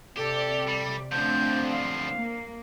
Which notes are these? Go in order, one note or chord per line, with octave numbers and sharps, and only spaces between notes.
C3 G4 A4 D5
G3
D3 F3 A3 C4 D4 G6
F5
A#3